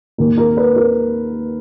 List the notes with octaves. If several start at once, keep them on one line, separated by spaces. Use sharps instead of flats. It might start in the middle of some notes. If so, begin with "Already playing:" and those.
D#2 D#3 A#3 A#4
A#4
B4
A#4